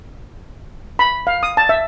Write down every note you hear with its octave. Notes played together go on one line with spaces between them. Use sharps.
B5
F5
D#6
A5
E5